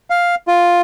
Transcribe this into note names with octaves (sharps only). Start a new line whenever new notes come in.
F5
F4